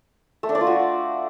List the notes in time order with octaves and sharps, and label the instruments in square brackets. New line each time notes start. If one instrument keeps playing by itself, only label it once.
[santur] A3
D4
D5
F4
F#4